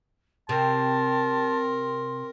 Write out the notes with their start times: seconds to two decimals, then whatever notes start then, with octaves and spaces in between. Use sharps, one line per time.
0.49 C3 A#4 A5 C6